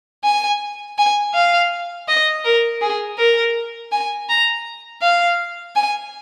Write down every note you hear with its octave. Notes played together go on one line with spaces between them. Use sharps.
G#5
G#5
F5
D#5
A#4
G#4
A#4
G#5
A#5
F5
G#5